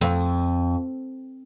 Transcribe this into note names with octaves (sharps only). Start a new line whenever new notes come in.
F2